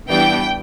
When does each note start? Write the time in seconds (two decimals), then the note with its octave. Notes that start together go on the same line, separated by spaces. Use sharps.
0.09 E3 G3 B3 D4 G5